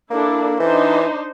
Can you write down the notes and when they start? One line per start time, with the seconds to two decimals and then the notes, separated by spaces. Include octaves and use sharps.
0.11 A#3 D4 E4 A4
0.60 E3 D4 D#4 C5